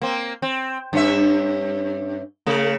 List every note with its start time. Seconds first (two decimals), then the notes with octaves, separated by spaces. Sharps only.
0.02 A#3 C4
0.42 C4
0.93 G2 C#4 E5
2.47 C#3 A3